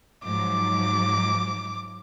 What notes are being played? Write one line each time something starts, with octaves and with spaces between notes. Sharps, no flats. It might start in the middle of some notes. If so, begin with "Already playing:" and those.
G#2 F3 F#3 D6